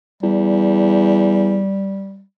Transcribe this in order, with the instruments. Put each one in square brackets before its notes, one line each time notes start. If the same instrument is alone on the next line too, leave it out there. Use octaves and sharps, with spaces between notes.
[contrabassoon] E2 [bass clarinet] G3